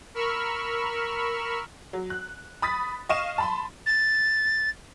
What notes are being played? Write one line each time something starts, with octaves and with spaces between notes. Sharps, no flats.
A#4 B5 C#6 E6 F6
F#3
F#6
B5 D#6 A6 B6
D#5 F5 C#6 D#7 E7
A5 B5 C6
A6